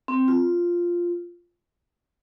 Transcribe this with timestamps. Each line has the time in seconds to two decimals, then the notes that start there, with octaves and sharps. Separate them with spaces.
0.08 C4
0.28 F4